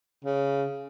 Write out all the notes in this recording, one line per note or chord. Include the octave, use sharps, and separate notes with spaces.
C#3